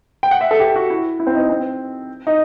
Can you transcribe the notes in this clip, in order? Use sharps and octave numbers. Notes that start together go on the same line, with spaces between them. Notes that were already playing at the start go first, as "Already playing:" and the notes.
G5
F#5
E5
A4
G4
F#4
E4
E4
C4
D#4
C4
D#4